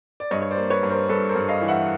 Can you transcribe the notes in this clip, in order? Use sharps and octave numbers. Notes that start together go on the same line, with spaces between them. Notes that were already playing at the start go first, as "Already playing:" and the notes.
D5
G2 C#5 D#5
C#5
C5 D5
A#3
B4 C#5
G2
A#4 C5
G2 A4 B4
A#4 C5
G2
D#5 F5
E3
E5 F#5